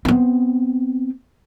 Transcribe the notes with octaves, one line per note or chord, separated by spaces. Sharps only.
B3 C4